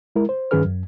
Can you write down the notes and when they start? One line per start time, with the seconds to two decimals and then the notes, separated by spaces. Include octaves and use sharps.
0.16 G#3 E4 A#4
0.29 C5
0.51 G2 D#3 C#4 G#4 B4 F6
0.65 F#2